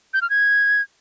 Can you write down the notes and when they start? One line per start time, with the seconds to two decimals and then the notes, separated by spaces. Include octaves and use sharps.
0.14 G6
0.22 F6
0.30 G#6